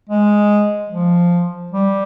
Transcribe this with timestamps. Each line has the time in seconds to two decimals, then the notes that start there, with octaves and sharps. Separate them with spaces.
0.09 G#3
0.90 F3
1.72 G3